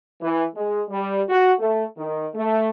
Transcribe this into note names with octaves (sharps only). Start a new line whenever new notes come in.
E3
G#3
G3
F#4
A3
D#3
A3